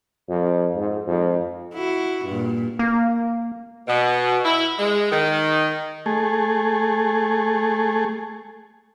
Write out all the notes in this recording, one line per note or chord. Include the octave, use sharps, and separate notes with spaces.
F2
G#2
F2
E4 F#4
G2 A#2
A#3
B2
E4
G#3
D#3
A3 G#4